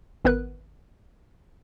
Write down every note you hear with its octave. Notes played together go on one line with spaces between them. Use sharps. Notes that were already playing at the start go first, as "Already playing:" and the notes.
G#1 B3 A#4 B4 F#6